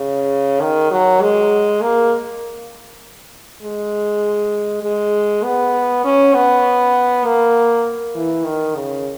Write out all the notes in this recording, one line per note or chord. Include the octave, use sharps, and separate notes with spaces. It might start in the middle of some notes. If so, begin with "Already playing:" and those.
Already playing: C#3
D#3
F#3
G#3
A#3
G#3
G#3
B3
C#4
B3
A#3
E3
D#3
C#3